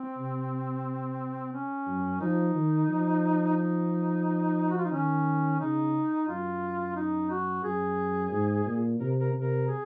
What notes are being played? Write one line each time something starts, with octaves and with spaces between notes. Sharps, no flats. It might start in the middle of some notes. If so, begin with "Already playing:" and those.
Already playing: C4
C3
C#4
F#2
F3 D#4
D#3
F3
D#4
F#4
F4
D#4
D#3 C#4
C#3 D#4
F#2 F4
D#4
F#4
F#2 G#4
G#2
A#2
C3 A#4
A#4
C3
A#4
G#4